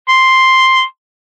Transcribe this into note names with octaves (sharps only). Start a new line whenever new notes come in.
C6